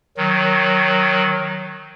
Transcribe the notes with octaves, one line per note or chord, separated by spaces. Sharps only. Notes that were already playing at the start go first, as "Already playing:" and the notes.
D#3 F#3